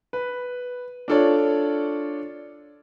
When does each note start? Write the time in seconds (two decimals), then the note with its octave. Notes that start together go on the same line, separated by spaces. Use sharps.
0.13 B4
1.08 D4 F4 A4 C#5 D5